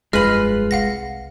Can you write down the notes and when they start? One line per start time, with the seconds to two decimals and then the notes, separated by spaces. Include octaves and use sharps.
0.13 F1 G2 G#3 F4 B4 F6 F#7
0.71 C2 F5 F#5 A#6